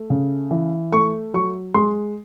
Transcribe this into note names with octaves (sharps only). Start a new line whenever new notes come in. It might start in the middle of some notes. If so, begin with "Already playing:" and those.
Already playing: A3
C#3
E3
A3 C#6
F#3 C#6
G#3 C6